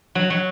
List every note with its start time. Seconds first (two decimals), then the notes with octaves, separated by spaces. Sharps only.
0.15 F#3
0.30 F#3